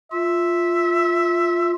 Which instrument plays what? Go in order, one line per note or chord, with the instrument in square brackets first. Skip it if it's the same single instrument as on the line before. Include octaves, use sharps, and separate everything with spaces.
[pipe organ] F4 [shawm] E5